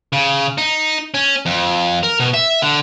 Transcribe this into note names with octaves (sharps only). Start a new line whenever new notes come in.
C#3
D#4
C#4
F2
A#4
B2
E5
D3